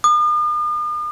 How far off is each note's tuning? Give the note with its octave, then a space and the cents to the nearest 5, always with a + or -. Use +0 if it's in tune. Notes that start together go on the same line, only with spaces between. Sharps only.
D#6 -45